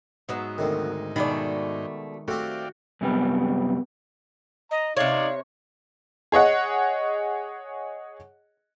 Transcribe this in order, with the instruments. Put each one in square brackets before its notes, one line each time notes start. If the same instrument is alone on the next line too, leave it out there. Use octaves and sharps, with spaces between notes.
[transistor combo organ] G#2 D#4 [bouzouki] F#3 B3 E5
[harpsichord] D2 C3 D#3
[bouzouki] B2 A3 D5 [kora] D#3 G#3 [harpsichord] B5
[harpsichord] A3 C4 G4 [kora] F#4 [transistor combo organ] D5 F5 G5
[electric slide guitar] F#2 C3 G3 B3
[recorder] D#5 [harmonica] A#5
[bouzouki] C3 C#5 [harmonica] D#4 D5 [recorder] F5
[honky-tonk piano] G#4 C#5 D#5 F#5